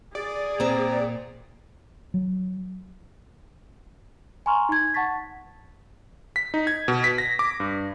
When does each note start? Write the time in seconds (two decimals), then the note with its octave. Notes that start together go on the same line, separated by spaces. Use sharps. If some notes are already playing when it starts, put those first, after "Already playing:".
0.15 G#4 D5
0.60 A#2 C4 A#5
2.14 F#3
4.46 G#5 A#5 C6 C#6 F6
4.69 D#4 G#6
4.94 F#5 A5 C#6 A6 B6
6.36 B6
6.54 D#4
6.67 G#6
6.88 B2
7.04 B6
7.18 A#6
7.39 D6
7.60 G2